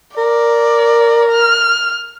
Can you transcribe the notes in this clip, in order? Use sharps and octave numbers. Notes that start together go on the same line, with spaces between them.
A#4 D5
F6